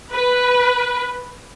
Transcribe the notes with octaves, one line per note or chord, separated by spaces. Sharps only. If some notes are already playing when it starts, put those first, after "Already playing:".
B4